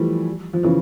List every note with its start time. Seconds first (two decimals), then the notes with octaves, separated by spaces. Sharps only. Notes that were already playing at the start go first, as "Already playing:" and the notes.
Already playing: E3 F3 G3 A3
0.53 F3
0.63 C#3 E3